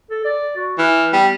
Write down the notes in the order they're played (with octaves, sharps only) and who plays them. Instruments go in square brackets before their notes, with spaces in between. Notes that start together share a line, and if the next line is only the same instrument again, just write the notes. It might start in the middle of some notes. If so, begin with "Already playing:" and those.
[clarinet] A4
D5
F#4
[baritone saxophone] E3 [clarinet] F6
[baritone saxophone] G3 [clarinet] B3